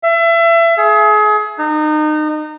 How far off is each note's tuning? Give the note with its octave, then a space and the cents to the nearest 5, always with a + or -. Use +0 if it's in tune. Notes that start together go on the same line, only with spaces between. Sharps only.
E5 +30
G#4 +30
D#4 -30